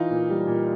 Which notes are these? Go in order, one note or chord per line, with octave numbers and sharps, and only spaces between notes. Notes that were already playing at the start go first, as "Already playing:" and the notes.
Already playing: E3 D#4 F4
A#2
G3
A#2